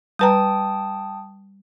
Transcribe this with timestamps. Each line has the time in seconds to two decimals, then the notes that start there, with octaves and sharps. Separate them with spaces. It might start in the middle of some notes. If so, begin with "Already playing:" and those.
0.19 G3 B4 G5 A5 A#5 D#6